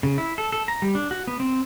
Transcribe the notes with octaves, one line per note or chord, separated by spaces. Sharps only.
C#3
E4
A4
A4
A#5
G3
D4
F#4
B3
C4